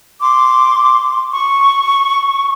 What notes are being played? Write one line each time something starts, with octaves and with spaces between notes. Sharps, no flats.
C6 D6
C#6